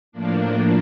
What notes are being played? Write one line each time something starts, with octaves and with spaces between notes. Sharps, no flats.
A2 F3 A#3 D4